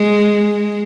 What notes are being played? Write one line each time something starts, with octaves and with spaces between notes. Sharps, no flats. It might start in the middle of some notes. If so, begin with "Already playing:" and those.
Already playing: G#3